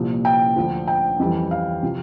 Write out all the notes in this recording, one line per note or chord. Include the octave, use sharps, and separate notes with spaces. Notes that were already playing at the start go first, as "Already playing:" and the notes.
Already playing: C2 A#2 F3
G5
D2 D3 F3
G5
F2 E3 G3
F5
C3 F3